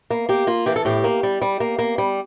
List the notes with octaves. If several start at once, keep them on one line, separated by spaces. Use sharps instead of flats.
A#3
A#3 G4
A#3 F4
E3 G4
A4
A2 G4
A#3
G3
G3
A#3
A#3
G3